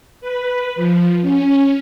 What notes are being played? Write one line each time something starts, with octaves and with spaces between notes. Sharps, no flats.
B4
F3
C#4